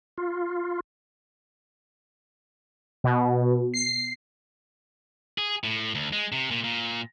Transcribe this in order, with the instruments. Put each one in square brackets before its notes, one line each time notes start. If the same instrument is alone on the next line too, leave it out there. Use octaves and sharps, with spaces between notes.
[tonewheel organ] F4
[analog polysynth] B2
C7
[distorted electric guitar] G#4
A2
D2
G#3
C3
A#2
A#2